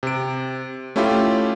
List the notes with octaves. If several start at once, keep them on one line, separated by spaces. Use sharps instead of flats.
C3 D7
A3 C#4 E4 F4 G4